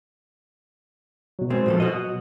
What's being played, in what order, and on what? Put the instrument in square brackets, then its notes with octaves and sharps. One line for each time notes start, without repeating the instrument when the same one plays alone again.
[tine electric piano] B2 F#3
[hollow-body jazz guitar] G#3 C4
A#2 F3 A4
F#4 D#5